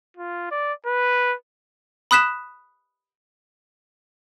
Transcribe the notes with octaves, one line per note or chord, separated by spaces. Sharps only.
F4
D5
B4
B5 D#6 F#6 B6 E7